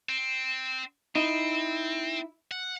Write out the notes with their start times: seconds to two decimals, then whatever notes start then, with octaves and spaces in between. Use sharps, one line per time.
0.09 C4
1.16 C4 D#4 E4
2.51 F#5